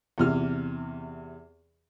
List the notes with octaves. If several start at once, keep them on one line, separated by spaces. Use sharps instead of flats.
E2 C3 F6